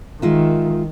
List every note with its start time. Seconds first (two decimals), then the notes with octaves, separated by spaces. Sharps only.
0.22 D#3 G#3 F4 E5